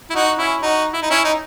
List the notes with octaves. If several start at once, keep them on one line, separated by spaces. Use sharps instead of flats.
E4
D#4 F#4
C#4 E4
D#4 F#4
E4
D#4
C#4 E4
D#4